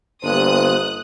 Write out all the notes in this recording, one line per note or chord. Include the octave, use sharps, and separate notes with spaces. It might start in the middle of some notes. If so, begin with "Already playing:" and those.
G1 A#3 C5 D#6 F#6